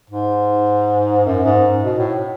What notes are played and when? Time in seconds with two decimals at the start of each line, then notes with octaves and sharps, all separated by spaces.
0.10 G#2
1.26 F#2
1.46 G#2
1.84 B2
1.98 A2